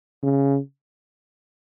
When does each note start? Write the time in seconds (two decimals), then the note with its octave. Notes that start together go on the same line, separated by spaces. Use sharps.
0.23 C#3